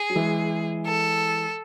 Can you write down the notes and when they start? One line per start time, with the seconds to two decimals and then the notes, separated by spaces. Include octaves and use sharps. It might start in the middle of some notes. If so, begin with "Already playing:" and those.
Already playing: G#4
0.10 F#3
0.15 E3 G#3
0.87 A4